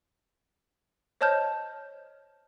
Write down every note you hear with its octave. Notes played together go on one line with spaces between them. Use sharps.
C5 C#5 D#5 A5 F6 G6